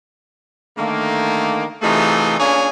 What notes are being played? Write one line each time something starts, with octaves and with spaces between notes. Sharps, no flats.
D3 D#3 A3 A#3
C3 E3 A3 D#4 F4 G#4
A#3 C#4 D4 F4 G#4 C#5